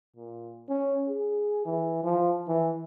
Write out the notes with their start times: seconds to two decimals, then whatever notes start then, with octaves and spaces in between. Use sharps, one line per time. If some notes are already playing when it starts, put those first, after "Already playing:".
0.16 A#2
0.69 C#4
1.08 G#4
1.65 E3
2.03 F3
2.48 E3